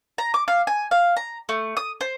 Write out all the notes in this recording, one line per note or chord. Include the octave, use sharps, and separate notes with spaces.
A#5
D6
F5
G#5
F5
A#5
A3
D#6
C5